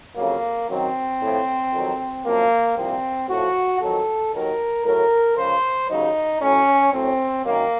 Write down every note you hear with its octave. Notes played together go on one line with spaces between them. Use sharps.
F2 C#3 F#3 A#3
F#2 D#3 F#3 C4
A2 F3
F2 D#3 F#3
F#2 F3 A#3
C2 A#2 F3 C4
A2 F3 F#4
F2 D#3 F#3 A4
D#2 D#3 F#3 A#4
A2 F#3 A#4
C#2 C#3 F3 C5
D#2 C#3 F#3 D#4
A2 F#3 C#4
A2 F#3 C4
F#2 D#3 F#3 A#3